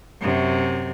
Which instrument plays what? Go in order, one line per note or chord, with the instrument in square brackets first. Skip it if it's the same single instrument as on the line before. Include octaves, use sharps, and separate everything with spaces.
[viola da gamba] F#2 C3